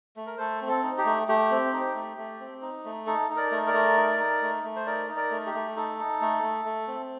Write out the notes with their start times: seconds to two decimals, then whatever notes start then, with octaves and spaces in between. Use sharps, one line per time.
0.17 A3
0.27 A#4
0.38 A3 A4 C5
0.61 C4
0.68 A4
0.83 D#4
0.98 G4
1.05 A3
1.28 A3 G4
1.51 C4
1.73 D#4
1.95 A3
2.17 A3
2.40 C4
2.62 D#4
2.85 A3
3.07 D#4 A4
3.30 D#4
3.36 A#4 D5
3.51 A3
3.66 A#4 D5
3.74 A3
3.97 D#4
4.19 D#4
4.42 A3
4.64 A3
4.76 C5
4.86 D#4 A#4 D5
5.09 D#4
5.16 A#4 D5
5.31 A3
5.46 G4
5.54 A3
5.76 D#4 A4
5.99 D#4
6.21 A3
6.43 A3
6.65 A3
6.87 C4